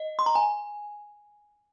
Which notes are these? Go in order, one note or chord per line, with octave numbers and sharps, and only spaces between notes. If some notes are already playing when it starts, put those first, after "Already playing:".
Already playing: D#5
C6
A#5
G#5